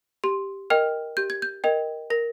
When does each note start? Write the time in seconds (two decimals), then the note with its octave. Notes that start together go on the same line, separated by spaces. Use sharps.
0.24 G4 C6
0.70 A#4 D#5 G5 F6
1.17 G4 G6
1.30 G#6
1.42 G6
1.64 A#4 D#5 G5 G#6
2.10 A#4 A#6